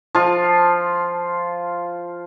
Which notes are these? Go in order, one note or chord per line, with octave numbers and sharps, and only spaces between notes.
F3 F4